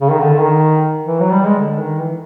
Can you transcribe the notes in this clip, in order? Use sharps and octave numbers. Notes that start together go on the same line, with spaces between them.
C#3
D#3
D3
D#3
E3
F#3
G3
G#3
D3
D#3
E3